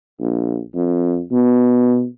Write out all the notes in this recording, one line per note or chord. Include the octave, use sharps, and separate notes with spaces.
A#1
F2
B2